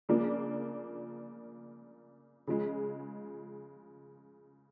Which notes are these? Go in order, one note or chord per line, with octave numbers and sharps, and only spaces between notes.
C#3 F3 A#3 D4
C#3 F3 G#3